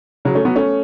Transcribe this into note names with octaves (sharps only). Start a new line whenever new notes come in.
C#3 F#3
A3 C#4
F#3 B3
A3 C#4